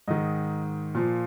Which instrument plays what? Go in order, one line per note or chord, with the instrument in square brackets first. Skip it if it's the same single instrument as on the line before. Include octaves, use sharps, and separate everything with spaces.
[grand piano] G#2 D#3 D#5
A#2 F3